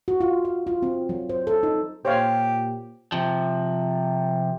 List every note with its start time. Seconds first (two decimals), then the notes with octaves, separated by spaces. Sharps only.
0.08 F#4
0.21 F4
0.45 F5
0.67 F4
0.82 C4
1.09 F#3
1.29 C5
1.47 A4
1.63 D#4
2.05 A#2 G4 C5 C#5 F5
3.12 C3 F3